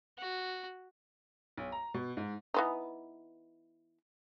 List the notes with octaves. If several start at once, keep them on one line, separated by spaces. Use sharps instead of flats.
F#4
B1
A#5
B2
G#2
E3 B3 D#4